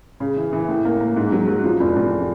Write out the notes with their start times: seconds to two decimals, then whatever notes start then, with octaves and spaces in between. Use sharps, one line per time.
0.20 C#3
0.36 E3
0.53 E3
0.68 A2
0.85 A#3
1.01 A#3
1.16 G#2
1.32 F#3
1.48 F#3
1.64 F3
1.80 F1
1.96 F1